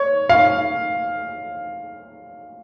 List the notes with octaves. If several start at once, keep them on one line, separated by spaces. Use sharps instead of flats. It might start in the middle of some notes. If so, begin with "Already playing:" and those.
Already playing: C#5
F5